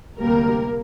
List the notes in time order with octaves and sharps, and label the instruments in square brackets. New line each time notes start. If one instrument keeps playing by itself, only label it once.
[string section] D2 C3 G3 A#3 A#4